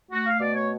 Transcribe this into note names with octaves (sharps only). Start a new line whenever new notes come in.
A3 F#4
F5
B2 D5
C#5